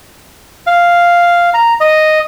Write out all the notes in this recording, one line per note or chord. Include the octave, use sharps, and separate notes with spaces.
F5
A#5
D#5